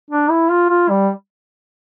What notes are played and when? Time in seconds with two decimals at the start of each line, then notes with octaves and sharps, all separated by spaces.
0.10 D4
0.30 E4
0.50 F4
0.70 F4
0.89 G3